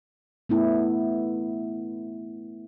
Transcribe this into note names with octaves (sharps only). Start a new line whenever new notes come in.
A3 B3 E4